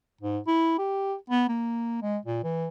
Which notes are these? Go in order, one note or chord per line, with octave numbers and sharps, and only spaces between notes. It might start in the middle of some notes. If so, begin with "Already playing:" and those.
G#2
E4
G4
B3
A#3
G#3
A#2
E3